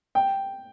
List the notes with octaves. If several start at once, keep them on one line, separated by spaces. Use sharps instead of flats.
G5